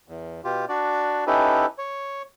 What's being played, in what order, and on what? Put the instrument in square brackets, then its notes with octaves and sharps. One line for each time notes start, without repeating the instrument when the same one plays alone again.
[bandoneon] E2
B2 F4 G4
D4 F#4 D5
C#4 D#4 E4 G4 A4 B4
C#5